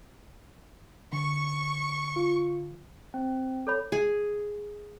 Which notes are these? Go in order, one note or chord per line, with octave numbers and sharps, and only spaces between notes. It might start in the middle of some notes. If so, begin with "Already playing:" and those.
D3 C#6
F4
C4
A4 C#5 B5
G#4